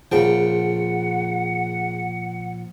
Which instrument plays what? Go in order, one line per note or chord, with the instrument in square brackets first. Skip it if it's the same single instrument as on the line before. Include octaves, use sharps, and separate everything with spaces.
[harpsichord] A#1 C#3 G5 [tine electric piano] A#2 F3 [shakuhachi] F#5